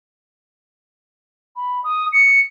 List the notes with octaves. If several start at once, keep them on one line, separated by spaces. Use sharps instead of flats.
B5
D#6
C#7